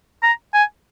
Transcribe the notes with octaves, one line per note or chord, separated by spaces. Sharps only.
A#5
G#5